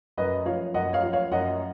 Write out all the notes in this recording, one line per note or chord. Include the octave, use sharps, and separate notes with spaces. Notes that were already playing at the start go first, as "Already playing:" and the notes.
F#2 B4 D#5
F3 C#5 F5
F#2 D#5 F#5
C#5 F5
F3
C#5 F5
F#2 D#5 F#5